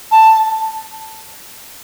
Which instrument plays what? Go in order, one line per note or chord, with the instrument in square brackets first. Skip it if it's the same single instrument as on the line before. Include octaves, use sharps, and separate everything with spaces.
[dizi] A5